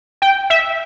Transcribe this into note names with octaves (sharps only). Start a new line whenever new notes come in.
G5
E5